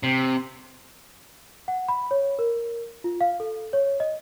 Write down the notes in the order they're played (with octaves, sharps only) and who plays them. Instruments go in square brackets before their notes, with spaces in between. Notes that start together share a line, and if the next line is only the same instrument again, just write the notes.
[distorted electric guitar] C3
[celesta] F#5
B5
C#5
A#4
F4
F5
A4
C#5
D#5